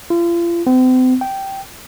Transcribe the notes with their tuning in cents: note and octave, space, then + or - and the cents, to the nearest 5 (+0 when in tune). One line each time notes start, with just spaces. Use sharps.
F4 -40
C4 -40
G5 -10